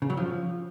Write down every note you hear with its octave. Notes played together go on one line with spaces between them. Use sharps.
C#3
F#3
F3